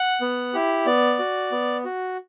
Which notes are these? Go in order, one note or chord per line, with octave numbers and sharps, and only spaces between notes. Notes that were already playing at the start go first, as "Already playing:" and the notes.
Already playing: F#5
B3
E4 G4
B3 D5
F#4
B3
F#4